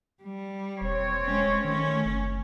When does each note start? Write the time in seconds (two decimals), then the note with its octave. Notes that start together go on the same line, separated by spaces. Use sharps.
0.23 G3
0.81 E1 C4 C#5
1.25 G#3 C#4
1.64 D#3 A3 C#4
2.05 F#1